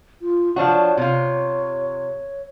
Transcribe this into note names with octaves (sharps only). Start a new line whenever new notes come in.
F4
F3 D4 F#4 C#5
C3 F4